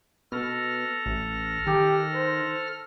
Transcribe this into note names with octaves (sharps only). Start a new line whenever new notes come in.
B2 A4 F6 A#6
A1
D#3 G4
C5